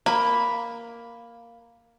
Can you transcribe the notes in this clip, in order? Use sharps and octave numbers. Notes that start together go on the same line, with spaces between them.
A#3 B5